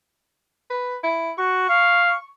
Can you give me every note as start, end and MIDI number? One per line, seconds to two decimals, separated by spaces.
0.70 0.96 71
1.04 1.31 64
1.38 1.64 66
1.38 2.29 85
1.69 2.16 77